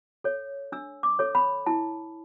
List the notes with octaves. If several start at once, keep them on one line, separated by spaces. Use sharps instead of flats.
A4 C#5
D4 E6
D6
A4 C#5
B5
E4 A5